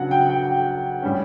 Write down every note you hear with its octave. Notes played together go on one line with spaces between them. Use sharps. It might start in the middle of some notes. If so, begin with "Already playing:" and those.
Already playing: C#3 F#3 D4 F#5
G5
G5
A2 G3 C#4